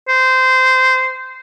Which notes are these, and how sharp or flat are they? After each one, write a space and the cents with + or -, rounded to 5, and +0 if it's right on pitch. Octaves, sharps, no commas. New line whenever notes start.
C5 -15